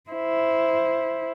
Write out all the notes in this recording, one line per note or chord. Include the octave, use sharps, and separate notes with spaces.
E4 C5